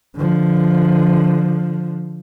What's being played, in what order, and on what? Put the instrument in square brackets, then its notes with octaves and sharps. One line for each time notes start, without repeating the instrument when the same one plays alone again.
[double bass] D3 F3